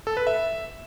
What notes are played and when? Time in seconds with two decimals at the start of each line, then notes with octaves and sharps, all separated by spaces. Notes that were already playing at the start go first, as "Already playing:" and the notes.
0.07 A4
0.17 B4
0.27 E5